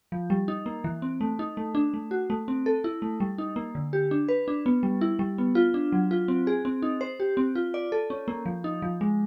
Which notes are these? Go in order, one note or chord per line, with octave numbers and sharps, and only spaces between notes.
F3
G3
D#4
A#3
E3
C4
A3
D#4
A3
D4
A3
F#4
A3
C4
A4
E4
A3
G3
D#4
A#3
D3
G4
D4
B4
D4
B3
G3
E4
G3
B3
F4
D4
F#3
F4
C4
G#4
C4
D#4
C5
G4
C4
F4
D5
A4
C#4
A#3
F3
D#4
F3
G#3